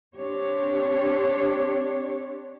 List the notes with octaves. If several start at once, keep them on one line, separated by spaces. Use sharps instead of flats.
C4 D4 G4 C#5